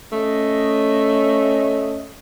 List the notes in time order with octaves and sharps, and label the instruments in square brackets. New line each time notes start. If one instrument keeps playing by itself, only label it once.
[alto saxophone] A3 [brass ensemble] C#4 D#5